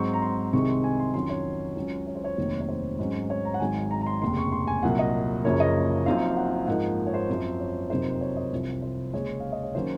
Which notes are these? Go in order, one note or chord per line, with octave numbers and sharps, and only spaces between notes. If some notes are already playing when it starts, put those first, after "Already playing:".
Already playing: G#2 F#3 C4 C#6
A#5
C6
C2 C3 D#3 G#3 C4 C#6
C6
G#5
C6
F2 D#3 F#3 C#4 C6
C#5
C#2 C#3 F#3 C#4
C#5
C5
C#5
F1 D#2 D#3 F#3
C#5
C5
G#2 F#3 C#4
C#5
A#5
F#5
G#1 G#2 D#3 F#3 G#5
A#5
A#5
C6
F1 D#2 C#3 C6
C#6
C6
G#5
C2 A#2 F#3 A#3 F#5
D#5
F#1 F#2 C#3 F3 A#3 C#5
D#5
F#1 F#2 F3 C4 D#4 F5
F#5
G#2 F3 A#3 D#4 F#5
C#5
C5
F#2 F3 C4
C#5
F2 C3 F#3 A#3 D#4 C5
C#5
D#5
C2 C3 F3
C5
D#2 C#3 G#3 C#5
F5
D#5
C#5
D#3 F#3 A#3 C#4 C5